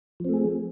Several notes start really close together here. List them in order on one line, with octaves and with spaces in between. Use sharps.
F3 C4 A3 G#4